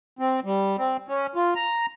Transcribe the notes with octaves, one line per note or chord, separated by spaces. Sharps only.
C4
G3
C4
C#4
F4
A#5